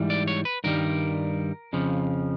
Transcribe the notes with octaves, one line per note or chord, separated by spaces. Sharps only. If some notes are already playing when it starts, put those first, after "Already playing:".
Already playing: G#2 E3 G3
D5
C#5
B4
G2 D#3 G3 A#4
F2 C#3 F3